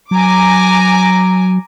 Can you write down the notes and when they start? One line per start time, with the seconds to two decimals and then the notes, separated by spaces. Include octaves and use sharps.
0.11 F#3 G#5 A#5 D6